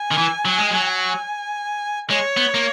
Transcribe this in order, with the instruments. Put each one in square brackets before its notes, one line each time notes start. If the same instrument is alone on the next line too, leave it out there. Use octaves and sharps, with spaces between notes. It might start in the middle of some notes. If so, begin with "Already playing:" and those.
Already playing: [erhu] G#5
[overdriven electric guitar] D#3
E3
F#3
G#3
F#3
[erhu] G#5
[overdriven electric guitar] G#3 [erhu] C#5
[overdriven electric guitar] B3
A#3